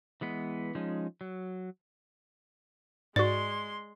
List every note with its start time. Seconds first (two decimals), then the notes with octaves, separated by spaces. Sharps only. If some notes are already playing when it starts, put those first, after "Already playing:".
0.21 E3 G#3 B3
0.75 F3 G#3 C#4 D#4
1.21 F#3
3.16 G#2 G#3 F#4 D5 C6